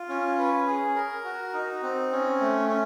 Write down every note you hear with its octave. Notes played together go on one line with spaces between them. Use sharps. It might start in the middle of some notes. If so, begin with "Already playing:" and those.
Already playing: F4
C#4
B4
G#4
A#4
F#4
D#4
C4
C#4
A3
C#4